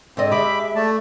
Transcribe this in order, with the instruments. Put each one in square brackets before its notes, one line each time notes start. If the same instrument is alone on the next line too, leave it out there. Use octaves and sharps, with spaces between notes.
[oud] G#2 D3 D#5 [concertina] C4
[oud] G#3 G4 [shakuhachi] E5 [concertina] B5 D6
[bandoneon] A3 [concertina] D5 A5